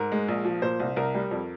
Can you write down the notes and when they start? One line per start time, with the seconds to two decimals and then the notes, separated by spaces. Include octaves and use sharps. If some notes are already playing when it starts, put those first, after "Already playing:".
Already playing: G#2 A#4
0.12 G#3
0.28 A#1
0.45 F3
0.62 A#2 C5
0.80 C2
0.96 C2 A#4
1.15 G3
1.31 F2